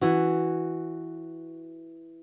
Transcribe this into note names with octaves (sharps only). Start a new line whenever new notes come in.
E3 F#4